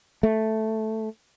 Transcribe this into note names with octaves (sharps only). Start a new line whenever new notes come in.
A3